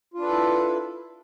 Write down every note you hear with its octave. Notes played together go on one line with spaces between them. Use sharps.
D4 E4 F4 A4 B4